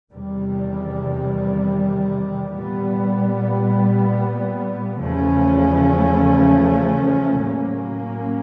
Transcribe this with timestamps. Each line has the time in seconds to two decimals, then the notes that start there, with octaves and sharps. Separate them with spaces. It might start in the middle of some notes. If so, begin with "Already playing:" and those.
0.13 E2 C3 D#3 G3
2.57 A#2 G3 B3
5.00 E2 C#3 F3 A3 C#4
7.45 A2 F#3 A#3 C#4